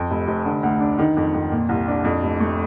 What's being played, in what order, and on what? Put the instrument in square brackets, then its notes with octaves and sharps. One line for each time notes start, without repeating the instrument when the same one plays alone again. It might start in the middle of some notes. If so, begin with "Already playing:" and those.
Already playing: [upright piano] F2
F1
F1
D3
D2
D4
D#3
F2
F2
A#2
C2
D4
F2
F1
A3